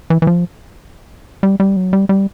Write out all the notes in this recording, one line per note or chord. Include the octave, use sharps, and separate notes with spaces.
E3
E3
F3
G3
G3
F#3
G3
G3